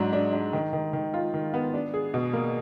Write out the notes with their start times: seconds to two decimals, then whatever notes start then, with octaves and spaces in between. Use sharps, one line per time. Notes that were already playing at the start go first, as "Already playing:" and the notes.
Already playing: G#2 F#3 D4
0.13 D4
0.33 D4
0.53 D#3
0.73 D#3
0.93 D#3
1.14 F4
1.34 D#3
1.54 B3
1.74 D4
1.94 G#4
2.14 B2
2.33 A#3